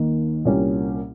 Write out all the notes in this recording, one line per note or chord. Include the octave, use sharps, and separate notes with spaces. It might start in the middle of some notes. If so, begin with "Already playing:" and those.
Already playing: D#2 D#3 A#3
C2 A#2 G3 A#3 C#4